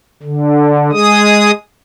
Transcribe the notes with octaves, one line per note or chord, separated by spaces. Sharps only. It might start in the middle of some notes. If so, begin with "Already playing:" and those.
D3
G#3 G#4 D#6